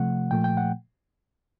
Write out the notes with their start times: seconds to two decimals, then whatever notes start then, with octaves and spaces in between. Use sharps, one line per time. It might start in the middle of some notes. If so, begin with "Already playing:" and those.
Already playing: C3 F3 A3 F#5
0.31 A#2 F3 A3 G5
0.44 G5
0.57 F#5